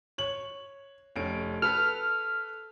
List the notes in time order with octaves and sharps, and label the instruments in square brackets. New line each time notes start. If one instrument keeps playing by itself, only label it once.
[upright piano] C#5 F#7
F1 C#4 D7
[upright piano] A4 B4 [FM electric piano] F6